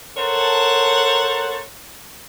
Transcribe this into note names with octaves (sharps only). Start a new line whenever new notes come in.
A4 A#4 C5 C#5 F#5 A5